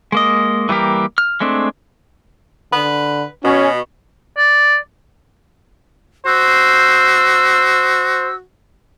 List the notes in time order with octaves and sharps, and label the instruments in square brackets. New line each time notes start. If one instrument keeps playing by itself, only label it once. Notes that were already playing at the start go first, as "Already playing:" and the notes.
[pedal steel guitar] G#3 A#3 D#5
E3 G3 A#3 G4 A#4
F6
G#3 A3 C4 D4
[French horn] D3 [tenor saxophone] B4
[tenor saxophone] B2 [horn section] C#4 [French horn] F#4
[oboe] D5
[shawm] F#4 [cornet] C5 [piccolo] E6